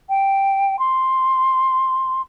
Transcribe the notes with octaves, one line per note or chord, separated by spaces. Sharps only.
G5
C6